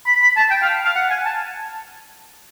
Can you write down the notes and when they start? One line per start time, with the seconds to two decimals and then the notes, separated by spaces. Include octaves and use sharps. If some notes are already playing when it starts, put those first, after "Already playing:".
0.06 B5
0.21 B5
0.36 A5
0.50 G5
0.62 F5
0.85 F5
0.95 F#5
1.10 G#5
1.26 A5